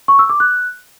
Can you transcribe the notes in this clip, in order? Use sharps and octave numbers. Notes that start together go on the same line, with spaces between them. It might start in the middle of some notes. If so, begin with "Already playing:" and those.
C#6
E6
D6
F#6